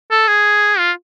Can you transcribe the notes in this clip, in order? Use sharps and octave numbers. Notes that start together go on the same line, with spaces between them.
A4
G#4
F4